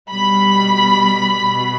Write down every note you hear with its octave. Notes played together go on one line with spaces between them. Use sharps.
B2 G3 B5
B2